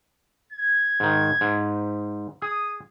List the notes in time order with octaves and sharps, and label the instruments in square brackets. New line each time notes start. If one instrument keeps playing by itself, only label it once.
[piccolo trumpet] G#6
[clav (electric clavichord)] G#2 D#3
G#2
[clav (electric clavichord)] G#4 [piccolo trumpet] D#6